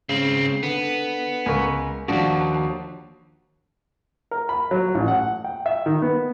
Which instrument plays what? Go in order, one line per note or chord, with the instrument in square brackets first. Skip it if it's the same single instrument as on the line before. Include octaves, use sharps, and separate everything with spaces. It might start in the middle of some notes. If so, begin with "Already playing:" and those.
[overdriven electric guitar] G#2 C4 [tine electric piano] C#3
[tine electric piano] D3 [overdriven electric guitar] B3
[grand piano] C#2 A#4 C#6 [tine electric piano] G#5
[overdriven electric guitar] D#2 G#2 [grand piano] F3 D4 [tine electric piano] F#4
[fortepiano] A#4
B5
F#3
A1
F#5
G5
E5
D#3
B3